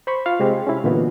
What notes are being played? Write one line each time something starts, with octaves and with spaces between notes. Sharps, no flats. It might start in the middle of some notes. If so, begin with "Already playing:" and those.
C5 B5 C#6
F4 F5
C3 G#3 C4 G4
C#4 E4
A#2 D3 E3 B3 D#4 F#4